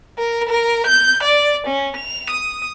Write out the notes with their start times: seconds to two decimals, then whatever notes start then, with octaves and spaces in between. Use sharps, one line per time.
0.18 A#4
0.49 A#4
0.86 G6
1.23 D5
1.67 C#4
1.97 F7
2.30 D#6